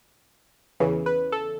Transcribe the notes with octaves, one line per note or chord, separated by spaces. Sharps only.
E2 C#3 E3
B4
A4